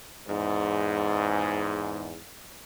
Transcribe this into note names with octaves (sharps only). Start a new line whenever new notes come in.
E2 G#2